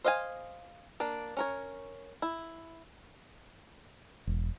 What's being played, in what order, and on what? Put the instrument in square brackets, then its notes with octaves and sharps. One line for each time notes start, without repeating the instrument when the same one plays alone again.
[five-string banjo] C5 D#5 F5 F#5 G#5
A#3 D4
C#4 A#4 C#5
E4
[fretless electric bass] E1